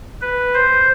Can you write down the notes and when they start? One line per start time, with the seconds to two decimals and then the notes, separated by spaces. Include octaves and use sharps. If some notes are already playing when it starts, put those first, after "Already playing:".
0.21 B4
0.54 C5